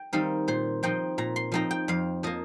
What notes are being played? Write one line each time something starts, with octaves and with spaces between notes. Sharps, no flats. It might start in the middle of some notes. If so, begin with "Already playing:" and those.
Already playing: G5
D#3 G3 C4 D#4 F5
A#2 C5
F3 C4 D#4 G5
A#2 A#5
C6
F3 C4 D#4 A#5
G5
F2 F5
F3 A#3 D#5